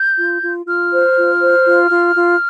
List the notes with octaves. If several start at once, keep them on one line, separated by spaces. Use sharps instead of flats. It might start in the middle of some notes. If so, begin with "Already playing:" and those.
Already playing: G6
F4
F4
F4 F6
C5
F4
C5
F4
F4
F4